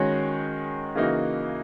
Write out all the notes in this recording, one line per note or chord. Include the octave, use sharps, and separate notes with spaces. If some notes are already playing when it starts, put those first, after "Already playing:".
Already playing: D#3 G#3 C#4 F#4 C#5
C#3 E3 A#3 D#4 F#4